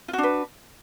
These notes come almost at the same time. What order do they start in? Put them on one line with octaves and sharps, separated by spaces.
F4 F#4 D4 B4